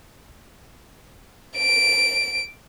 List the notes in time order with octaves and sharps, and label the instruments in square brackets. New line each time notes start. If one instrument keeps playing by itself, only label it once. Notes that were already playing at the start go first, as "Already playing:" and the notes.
[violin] D7